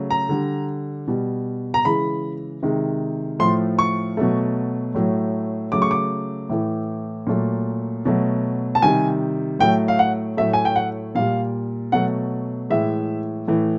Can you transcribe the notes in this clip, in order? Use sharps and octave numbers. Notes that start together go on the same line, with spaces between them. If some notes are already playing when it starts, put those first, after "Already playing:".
Already playing: C#3 F#3 A3
A#5
D3 G3
B2 G3
A#5
C#3 E3 G#3 B5
C3 D#3 G#3
A2 F3 A3 C6
C#6
B2 F#3 A3
A2 F#3 A3
C#3 F#3 A3 D6
C#6
D6
A2 E3 A3
A#2 F#3 A3
B2 F#3 A3
A5
C3 D#3 G3 G#5
A2 F#3 A3 G5
F5
F#5
A2 F#3 A3 E5
G#5
G5
F#5
A#2 G3 F5
B2 F#3 A3 F#5
A2 E3 G#3 E5
A2 E3 A3